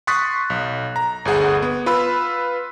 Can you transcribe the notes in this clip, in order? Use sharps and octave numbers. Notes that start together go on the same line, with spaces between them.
C6 C#6 D#6 F#6 A6 B6
B1
A#5
G1 D2 G#4 F#5
B3
F4 B4 B5 E6